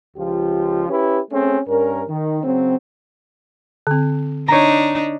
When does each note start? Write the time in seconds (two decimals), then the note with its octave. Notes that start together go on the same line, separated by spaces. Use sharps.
0.17 C#2 F3 F4 G4
0.89 C#4 E4 G4 B4
1.31 A3 C4 C#4 G#4
1.67 G2 C#4 A#4
2.08 D#3
2.43 C#3 F#3 C4
3.87 D3 C4
4.48 D4 D#4 C#5 A#5